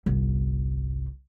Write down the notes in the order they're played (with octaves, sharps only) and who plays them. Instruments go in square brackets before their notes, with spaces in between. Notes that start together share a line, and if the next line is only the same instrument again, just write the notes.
[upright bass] G1 C2